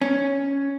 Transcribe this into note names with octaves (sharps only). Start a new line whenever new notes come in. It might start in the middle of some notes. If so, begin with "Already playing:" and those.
C#4